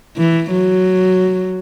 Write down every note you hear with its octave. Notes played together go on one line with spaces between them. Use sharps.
E3
F#3